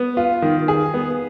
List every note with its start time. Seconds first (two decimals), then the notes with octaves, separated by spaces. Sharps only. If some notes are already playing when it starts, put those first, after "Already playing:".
Already playing: B3
0.17 F4
0.42 D#3
0.68 G#4
0.94 B3